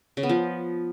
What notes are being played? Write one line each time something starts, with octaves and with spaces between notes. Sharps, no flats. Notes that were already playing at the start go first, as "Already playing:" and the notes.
C#3
B3
F3